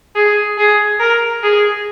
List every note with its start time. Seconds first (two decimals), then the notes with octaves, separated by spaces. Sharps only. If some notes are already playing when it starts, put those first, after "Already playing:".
0.16 G#4
0.58 G#4
1.00 A#4
1.43 G#4